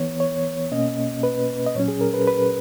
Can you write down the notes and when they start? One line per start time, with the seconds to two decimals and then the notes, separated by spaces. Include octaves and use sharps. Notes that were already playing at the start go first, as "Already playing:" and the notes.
Already playing: E3 B3 C#5
0.20 C#5
0.71 B2 A#3 C#4 D#5
1.23 B4
1.67 D#5
1.75 A#2 F#3 C#4 C#5
1.88 G#4
2.01 A#4
2.14 B4
2.27 B4